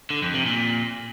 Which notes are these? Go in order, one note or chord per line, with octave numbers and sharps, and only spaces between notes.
D3
F2
C3
A#2